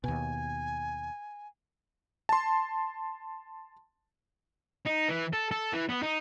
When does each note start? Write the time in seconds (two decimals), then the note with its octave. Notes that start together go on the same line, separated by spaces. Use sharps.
0.04 D#2 B2 G#5
2.29 A5 C6
4.86 D#4
5.08 E3
5.33 A4
5.51 A4
5.73 E3
5.89 B3
6.03 D#4